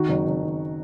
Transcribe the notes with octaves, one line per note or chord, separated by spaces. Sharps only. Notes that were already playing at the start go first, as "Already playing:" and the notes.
Already playing: D#3 F#4
F#1
F#1
D#3